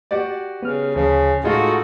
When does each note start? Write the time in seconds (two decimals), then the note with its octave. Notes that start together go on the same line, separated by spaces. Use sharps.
0.11 F#4 G4 D5
0.62 C#3 B3 F6
0.96 D2 C#3 F3
1.44 A2 G#3 A3 D#4 F4 F#4